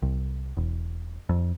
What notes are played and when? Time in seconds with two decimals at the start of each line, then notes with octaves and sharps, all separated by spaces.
0.02 C2
0.57 E1
1.29 F2